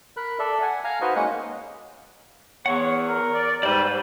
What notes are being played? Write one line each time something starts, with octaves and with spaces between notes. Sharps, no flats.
A#4 B5 F#6
A4 D5 E5
F#5 G#5
F5 G#5 A#5 F6
D#4 F#4 B4 C5 D#5 C#6
G#3 A#3 C#4 D#4 F#5 F#6
E2 C#5 F#5 C#6
A#4
D5
G#2 G3 G4 B4 C5 D5